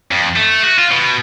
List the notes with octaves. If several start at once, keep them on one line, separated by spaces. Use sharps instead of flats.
F2
A3
F#4
F4
B2